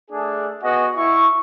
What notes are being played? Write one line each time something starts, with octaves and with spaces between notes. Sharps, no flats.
A3 D4 G#4
B3 F#4 G#4 D#5 F#5
E4 C#6